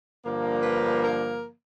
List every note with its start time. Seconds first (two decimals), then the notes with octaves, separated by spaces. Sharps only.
0.24 G2 D3 F3 A#3
0.63 B4
1.03 A#4